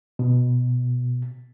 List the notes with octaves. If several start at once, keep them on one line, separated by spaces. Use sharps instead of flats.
B2